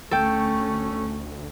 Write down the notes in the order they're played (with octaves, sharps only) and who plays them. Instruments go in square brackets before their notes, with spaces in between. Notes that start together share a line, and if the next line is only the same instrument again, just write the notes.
[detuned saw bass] D2 [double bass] A3 C#4 [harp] A4 G5